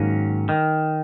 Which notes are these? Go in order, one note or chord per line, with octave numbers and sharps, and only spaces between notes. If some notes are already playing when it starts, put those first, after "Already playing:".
Already playing: G#2 D#3 F#3 A#3 C#4
D#3